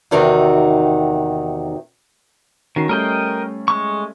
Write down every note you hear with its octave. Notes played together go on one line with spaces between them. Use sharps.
E2 C3 D#3 C4 D#4 F#4
D#3 C#4 F#4 C7
G3 A3 C#4 A#4 D#5 G5
G#3 C#6